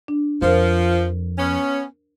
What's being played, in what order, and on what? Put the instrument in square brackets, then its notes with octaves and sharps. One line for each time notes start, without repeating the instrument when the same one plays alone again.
[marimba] D4
[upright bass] F2 [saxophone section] F3 [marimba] A#4 C5
[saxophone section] B3 C#4